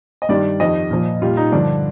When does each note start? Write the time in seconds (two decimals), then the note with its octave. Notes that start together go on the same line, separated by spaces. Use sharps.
0.22 D#5
0.29 G2 D#3 G3 D5
0.60 F2 D#3 G3 D#5
0.91 A#2 F3
1.22 A#2 G3 F4
1.37 D#4
1.52 G2 D3 F3 D4